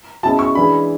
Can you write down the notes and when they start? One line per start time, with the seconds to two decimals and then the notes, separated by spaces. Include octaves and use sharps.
0.23 B2 G#3 C#4 E4 A5
0.39 C#6
0.55 E3 G#3 D4 B5